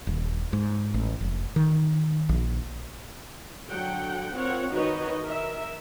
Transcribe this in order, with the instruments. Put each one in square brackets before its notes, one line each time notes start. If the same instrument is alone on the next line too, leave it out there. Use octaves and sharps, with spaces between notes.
[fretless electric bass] D#1
G#2
A1
F1
D#3
A#1
[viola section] D3 F#3 F#5 G5
C4 F4 A#4 C#5 F#5
D#3 D#4 F#4 B4 C#5 D#5
A#4 E5